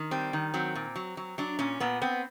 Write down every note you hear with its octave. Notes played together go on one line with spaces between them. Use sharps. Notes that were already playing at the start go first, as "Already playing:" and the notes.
Already playing: D#3
G3 C4
D#3
F#3 C4
A#2
F#3
F#3
F#3 D4
A#2 C#4
A#2 B3
B3 C4